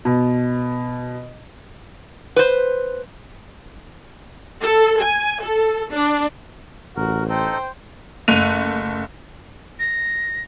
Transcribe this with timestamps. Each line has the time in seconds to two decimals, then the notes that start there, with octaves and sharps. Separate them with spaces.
0.05 B2
2.36 B4 C5
4.63 A4
5.01 G#5
5.43 A4
5.92 D4
6.96 A1 F#4 A#4
7.29 D#4 A4 C5 G5
8.28 F#1 A3 F#6 D#7 F7
9.80 A#6